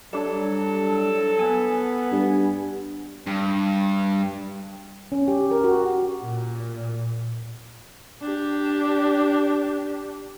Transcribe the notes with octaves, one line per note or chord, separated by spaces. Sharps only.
A2 F#3 G3 D4 A4
B3 G#5
G2
G2
C#4
G4
A#4
F#4
A#2
D4 G4